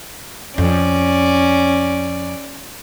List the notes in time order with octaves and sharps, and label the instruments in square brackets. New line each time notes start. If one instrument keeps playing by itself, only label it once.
[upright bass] F2 [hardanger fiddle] C#4 D5